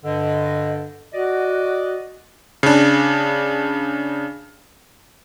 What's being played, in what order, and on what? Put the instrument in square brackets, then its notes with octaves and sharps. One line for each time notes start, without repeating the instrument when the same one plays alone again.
[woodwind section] G2 D3 [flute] D#5
[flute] F#4 [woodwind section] D5 D#5
[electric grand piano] C#3 D4